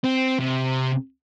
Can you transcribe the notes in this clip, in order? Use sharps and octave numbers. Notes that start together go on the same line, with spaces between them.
C4
C3